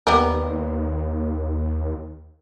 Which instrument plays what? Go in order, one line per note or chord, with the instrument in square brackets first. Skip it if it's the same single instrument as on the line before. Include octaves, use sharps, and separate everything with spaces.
[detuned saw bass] D#2 [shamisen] G3 B3 A#4